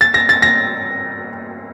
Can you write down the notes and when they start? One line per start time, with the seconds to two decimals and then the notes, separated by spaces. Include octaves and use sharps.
0.01 A6
0.14 A#6
0.29 A6
0.42 A#6